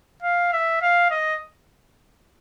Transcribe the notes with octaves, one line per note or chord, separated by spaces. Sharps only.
F5
E5
F5
D#5